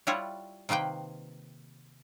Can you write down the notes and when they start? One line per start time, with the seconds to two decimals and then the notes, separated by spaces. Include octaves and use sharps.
0.07 G3 E4 F4 C#5 F#5
0.69 C3 D#3 A#3 B4 G5